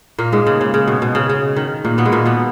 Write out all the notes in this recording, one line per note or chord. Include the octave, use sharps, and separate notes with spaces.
A#2 A#3
G#2 G#3
C#3
C#3
C#3
B2
B2
C#3
C#3
D#3
A#2 A#3
B2 B3
G#3
A#2 A#3
B2 B3